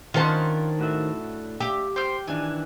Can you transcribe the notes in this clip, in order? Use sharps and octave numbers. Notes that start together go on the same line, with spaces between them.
D#3 C#4 D4 F4 C5 F#5 A5
A2 F#4 E5
G4 E5
C5 G5 F6
D#3 E3 D4 G#5